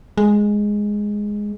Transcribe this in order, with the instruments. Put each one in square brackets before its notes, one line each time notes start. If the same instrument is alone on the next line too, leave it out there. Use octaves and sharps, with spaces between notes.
[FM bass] G#3